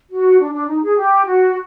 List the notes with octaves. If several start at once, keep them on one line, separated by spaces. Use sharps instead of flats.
F#4
D4
D4
D#4
G#4
G4
F#4